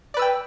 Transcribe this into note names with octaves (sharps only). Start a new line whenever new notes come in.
B4 D5 G5 E6